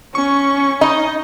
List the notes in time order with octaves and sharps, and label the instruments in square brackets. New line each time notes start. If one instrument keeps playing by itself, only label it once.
[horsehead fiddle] C#4 [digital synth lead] C#6
[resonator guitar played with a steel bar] D#4 [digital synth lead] D#5